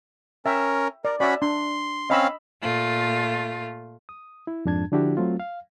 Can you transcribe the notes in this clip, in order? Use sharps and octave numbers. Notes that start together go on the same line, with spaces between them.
C#4 A#4 E5 G5
A#4 D5
C#4 F#4 D5 E5 B5
D4 C6
C4 C#4 D#5 F5 B5 E6
A#2 A3 F4
D#6
E4
F2 G#2 D4 A5 G#6
D3 F3 D4 E4 F#4 G4
F#3 A3 C4 F4
F5